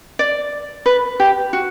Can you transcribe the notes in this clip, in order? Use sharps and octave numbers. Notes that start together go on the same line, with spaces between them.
D5
B4
G4
F#4